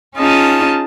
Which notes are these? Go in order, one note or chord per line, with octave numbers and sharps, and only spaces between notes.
C#4 D#4 F4 G#4 A5